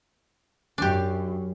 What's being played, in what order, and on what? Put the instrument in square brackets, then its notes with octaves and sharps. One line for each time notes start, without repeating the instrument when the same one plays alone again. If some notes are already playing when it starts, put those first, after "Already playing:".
[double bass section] F#2 [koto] D4 G4